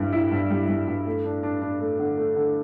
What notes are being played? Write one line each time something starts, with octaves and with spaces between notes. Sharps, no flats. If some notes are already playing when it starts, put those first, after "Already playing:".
Already playing: G2 G3 E4
E4
G2
G3
G3
G2
A3
D4
D4
D4
A3
D3
A3
D3